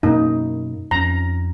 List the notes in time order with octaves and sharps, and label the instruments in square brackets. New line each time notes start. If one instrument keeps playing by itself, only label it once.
[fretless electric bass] F#2 B2 A#3 [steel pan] D#4
[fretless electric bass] F2 C#4 [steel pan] A#5